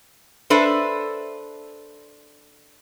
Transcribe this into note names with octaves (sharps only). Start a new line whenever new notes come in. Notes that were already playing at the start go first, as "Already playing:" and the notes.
D4 A4 B4 C5 E5